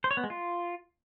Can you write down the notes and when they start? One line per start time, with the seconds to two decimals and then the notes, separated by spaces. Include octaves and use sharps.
0.04 C5
0.11 C#5
0.17 B3
0.24 G#3
0.30 F4